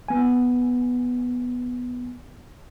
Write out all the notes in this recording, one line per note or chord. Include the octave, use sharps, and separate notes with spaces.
B3 G#5